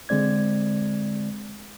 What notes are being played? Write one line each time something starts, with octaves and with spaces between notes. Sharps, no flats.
D3 G#3 C4 D5 G#6